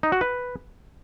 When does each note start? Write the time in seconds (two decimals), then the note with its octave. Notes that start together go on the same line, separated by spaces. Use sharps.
0.03 D#4
0.12 F#4
0.21 B4